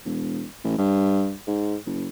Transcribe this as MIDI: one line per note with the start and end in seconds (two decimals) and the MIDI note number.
0.06 0.45 28
0.64 0.73 33
0.78 1.33 43
1.47 1.76 44
1.86 2.08 30